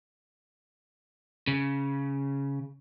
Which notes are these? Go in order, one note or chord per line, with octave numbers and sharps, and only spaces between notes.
C#3